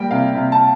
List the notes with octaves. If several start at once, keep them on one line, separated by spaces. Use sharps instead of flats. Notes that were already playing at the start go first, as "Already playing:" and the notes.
Already playing: G3 A#3 G5
C3 F5
C3
A5